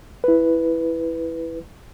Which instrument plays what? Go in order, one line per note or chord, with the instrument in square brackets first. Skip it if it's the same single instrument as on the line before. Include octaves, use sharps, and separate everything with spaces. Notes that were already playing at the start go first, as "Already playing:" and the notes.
[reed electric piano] E4 B4